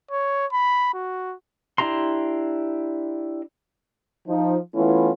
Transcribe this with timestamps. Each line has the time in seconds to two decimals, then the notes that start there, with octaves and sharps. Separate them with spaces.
0.11 C#5
0.52 B5
0.94 F#4
1.78 D4 E4 G4 A#5 C6
4.28 F3 D#4
4.75 E3 A3 B3 C#4 E4 F4